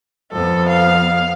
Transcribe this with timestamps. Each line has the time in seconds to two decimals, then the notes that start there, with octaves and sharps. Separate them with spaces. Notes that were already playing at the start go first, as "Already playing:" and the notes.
0.32 F2 B3 A4
0.69 F5